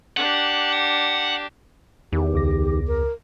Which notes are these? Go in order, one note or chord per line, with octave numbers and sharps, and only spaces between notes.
D4 G4 F#5
E2 D#3 G4
C#2 D6 A#6
A#4